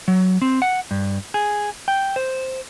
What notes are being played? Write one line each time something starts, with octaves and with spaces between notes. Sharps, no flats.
F#3
C4
F#5
G2
G#4
G5
C5